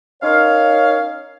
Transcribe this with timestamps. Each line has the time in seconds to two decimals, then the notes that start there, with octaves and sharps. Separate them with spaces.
0.23 C#4 D#4 A#4 C#5 F5